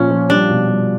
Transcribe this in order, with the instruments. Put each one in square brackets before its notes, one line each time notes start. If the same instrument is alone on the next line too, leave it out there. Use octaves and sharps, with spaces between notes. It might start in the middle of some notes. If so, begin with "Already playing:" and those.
Already playing: [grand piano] A#2 F3 [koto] C#4
[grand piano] F3
[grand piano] G3 [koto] D4
[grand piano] B2
G3